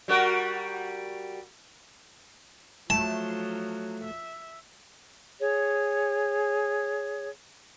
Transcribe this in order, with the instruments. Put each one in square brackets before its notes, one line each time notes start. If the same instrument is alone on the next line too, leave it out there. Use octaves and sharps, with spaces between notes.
[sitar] G3 F#4 A#4
[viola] F3 F#3 [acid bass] A3 [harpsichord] A5
[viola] E5
[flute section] G#4 C#5